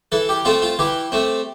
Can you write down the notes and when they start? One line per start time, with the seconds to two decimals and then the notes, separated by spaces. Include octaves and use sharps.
0.12 E3 A4
0.29 G4
0.45 A3 C4 F4
0.62 F4
0.79 E3 G4
1.12 A3 C4